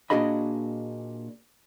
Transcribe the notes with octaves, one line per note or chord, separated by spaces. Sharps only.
A#2 D4 F#4 G#4 D#5 B5